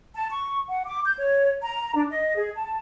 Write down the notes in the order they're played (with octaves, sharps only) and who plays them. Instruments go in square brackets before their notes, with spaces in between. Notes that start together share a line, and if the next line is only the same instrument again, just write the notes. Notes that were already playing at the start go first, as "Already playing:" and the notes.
[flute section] A5
C#6
F#5
D6
G6
C#5
A#5
D4
D#5
G#4
A5